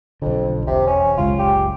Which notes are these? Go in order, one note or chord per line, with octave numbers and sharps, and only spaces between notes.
B1 F2 D3
E1 C3
C#4
F#1 C#2 G#3 F4
G4